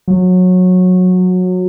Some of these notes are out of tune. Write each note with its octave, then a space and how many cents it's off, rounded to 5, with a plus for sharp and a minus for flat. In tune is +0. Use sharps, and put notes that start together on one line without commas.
F#3 -20